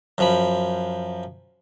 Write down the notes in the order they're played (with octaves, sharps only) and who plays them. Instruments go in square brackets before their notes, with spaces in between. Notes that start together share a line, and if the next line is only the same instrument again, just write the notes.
[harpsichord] F#2 F3 B5